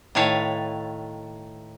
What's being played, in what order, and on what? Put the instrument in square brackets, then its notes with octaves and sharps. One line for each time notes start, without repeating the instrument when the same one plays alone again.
[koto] A2 D#3 B4 C#5 F5 A5